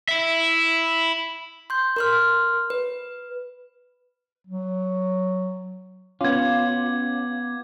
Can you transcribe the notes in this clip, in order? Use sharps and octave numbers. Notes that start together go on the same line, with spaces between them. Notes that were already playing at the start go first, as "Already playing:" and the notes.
E4 E5
C6 G6
A#4 C6 F6
B4
F#3
B3 C#4 F4 D6 G#6